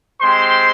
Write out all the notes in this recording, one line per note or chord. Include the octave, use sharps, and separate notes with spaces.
G#3 C4 G4 C5 C6